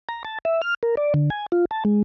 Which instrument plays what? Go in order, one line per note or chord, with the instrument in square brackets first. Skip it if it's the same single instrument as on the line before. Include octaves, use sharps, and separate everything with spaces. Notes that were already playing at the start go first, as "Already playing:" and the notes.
[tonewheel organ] A#5
A5
E5
F6
A#4
D5
D3
G#5
F4
A5
G#3